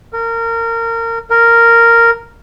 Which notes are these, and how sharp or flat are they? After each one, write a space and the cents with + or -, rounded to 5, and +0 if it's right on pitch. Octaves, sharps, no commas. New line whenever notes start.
A#4 -25
A#4 -5